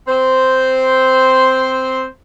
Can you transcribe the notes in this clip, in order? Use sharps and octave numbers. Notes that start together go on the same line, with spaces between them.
C4 C5